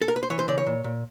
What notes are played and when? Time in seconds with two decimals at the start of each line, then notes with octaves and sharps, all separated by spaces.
0.02 A4
0.08 A#4
0.16 B4
0.23 C5
0.30 E3 C#5
0.39 C5
0.48 C#3 D5
0.58 C#5
0.67 A#2
0.84 A#2